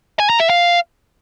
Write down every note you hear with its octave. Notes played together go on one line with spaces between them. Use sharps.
G#5
A#5
E5
F5